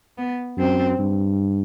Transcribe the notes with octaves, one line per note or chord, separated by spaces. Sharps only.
B3
F#2 C4
G2